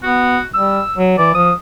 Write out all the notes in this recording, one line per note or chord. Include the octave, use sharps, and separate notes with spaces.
B3 F#4
G3 E6
F#3
E3 D5
F3 D#6